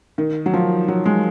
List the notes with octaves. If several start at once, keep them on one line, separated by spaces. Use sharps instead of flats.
D#3
F#3
F3
F#3
G#3